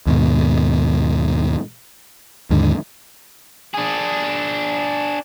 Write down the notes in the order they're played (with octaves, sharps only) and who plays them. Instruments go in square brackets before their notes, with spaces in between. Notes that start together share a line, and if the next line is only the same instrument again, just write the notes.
[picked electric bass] D#2 G#2 B2
D#2 G#2 D3
[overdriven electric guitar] D4 G#4